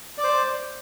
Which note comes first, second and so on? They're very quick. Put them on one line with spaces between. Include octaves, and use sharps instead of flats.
D5 D6 C5